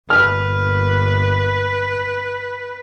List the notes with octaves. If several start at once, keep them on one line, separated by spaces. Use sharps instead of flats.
G1 A#2 B4 F6